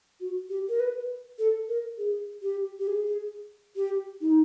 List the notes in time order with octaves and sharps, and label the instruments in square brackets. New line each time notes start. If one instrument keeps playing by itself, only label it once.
[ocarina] F#4
G4
A#4
B4
A4
A#4
G#4
G4
G4
G#4
G4
D#4